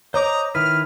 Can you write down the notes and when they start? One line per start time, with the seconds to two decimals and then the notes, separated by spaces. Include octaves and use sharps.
0.14 C5 C#5 D#5 A#5 D6
0.55 D#3 E4 B4 F6